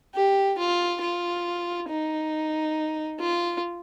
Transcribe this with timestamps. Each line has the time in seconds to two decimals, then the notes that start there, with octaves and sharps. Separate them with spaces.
0.14 G4
0.58 F4
1.01 F4
1.89 D#4
3.19 F4